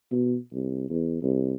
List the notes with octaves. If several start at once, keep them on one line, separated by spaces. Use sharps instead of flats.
B2
C2
E2
C2